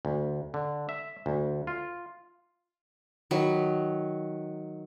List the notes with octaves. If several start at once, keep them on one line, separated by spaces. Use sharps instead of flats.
D2
D3
E5
D2
F4
D#3 F#3 B4